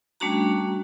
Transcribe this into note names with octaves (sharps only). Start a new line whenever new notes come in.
G3 A3 C#4 D4 F#4 A#5